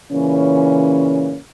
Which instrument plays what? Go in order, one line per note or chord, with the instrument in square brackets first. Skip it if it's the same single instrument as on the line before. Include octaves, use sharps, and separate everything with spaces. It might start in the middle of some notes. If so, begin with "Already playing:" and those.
[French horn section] A#2 C#3 E3 C#4